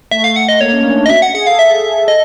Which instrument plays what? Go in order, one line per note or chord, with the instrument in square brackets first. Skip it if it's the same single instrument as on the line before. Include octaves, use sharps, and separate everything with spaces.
[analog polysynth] A3 [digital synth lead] E5
[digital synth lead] F5
F#5
D#5
[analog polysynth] A#3 [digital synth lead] C#5
[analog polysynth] C#4
D4
D#4
[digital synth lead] D#5
[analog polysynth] F#4 [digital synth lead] E5
[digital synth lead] F#5
[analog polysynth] G#4 [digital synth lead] F#5
[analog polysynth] A4 [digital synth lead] F5
[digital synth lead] E5
[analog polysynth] A4 [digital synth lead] D#5